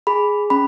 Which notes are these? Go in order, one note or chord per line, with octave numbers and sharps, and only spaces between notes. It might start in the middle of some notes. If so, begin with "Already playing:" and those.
G#4 B5
C#4 B5